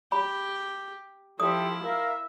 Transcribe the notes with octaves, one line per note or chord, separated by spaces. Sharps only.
G4 B5
F3 E4 G4 A4 E5 D#6
A#4 E5 F5